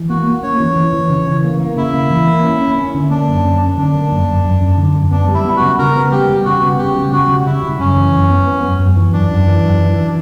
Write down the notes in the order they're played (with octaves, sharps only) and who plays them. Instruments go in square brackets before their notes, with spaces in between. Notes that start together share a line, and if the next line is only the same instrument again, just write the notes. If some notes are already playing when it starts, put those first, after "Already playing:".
Already playing: [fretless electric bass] E3
[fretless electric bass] A#3 [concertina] F#4
[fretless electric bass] A#3
[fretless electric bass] C#4 [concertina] C#5
[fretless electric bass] E3
E3
E3
C#3
E3
A#3
A#3
[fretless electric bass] C#3 [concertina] E4
[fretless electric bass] A#3
E3
A#3
C#4
C#4
C#4
D3
[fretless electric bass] A#3 [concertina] D4
[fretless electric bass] F#2
C#4
C#4
[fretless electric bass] D3 [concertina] D4
[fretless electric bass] A#3
F#2
F#2
F#2
F#2
D3
F#2
[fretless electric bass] B3 [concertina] D4
[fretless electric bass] G3
[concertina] E4
[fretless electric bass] B3
[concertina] F#4
[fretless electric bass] C#3
[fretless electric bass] C#3 [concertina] A#4
[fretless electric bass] B3
[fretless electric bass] G3 [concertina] G4
[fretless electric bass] G3
[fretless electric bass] C#3 [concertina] F#4
[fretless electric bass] B3
[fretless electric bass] C#3 [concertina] G4
[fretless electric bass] G3
[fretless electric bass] C#3 [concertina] F#4
[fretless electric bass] G3
[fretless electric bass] C#3 [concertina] E4
[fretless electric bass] C#3
[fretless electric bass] F#2 [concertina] C#4
[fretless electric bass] E3
F#2
B3
B3
F#2
F#2
E3
[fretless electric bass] F#2 [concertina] D4
[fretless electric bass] F#2
E3
F#2
E3
E3